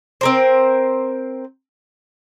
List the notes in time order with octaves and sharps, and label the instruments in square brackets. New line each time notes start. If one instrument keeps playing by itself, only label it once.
[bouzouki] C4 A#4 C5